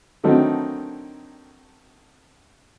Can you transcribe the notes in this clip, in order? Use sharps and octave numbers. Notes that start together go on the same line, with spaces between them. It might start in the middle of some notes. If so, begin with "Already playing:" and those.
D3 D#3 F#3 A3 C4 D#4